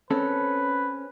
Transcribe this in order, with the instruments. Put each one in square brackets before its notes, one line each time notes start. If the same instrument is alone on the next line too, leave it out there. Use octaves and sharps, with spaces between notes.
[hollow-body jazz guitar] C4 C#4 A4 [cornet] B4